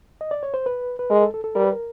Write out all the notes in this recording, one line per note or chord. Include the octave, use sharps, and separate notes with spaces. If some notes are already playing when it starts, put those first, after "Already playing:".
D#5
D5
C#5
C5
B4
B4
G#3 A#4
A4
A4
A4
G3 A#4
B4
A#4